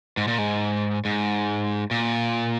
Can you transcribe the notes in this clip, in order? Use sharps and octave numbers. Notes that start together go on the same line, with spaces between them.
G#2
A#2
G#2
G#2
A#2